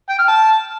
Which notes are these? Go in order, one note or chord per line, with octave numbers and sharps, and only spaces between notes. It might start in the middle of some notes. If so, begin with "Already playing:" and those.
G5
F6
A5